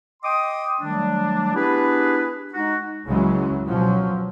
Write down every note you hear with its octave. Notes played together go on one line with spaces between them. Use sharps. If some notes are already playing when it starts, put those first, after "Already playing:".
D#5 G5 C6 D6 D#6
D#3 F#3 G3 A3 D4
B3 D4 E4 G4 G#4 B4
G#3 D#4 F#4
C#2 C#3 E3 F#3 G#3 C#4
B2 F3 F#3 C#4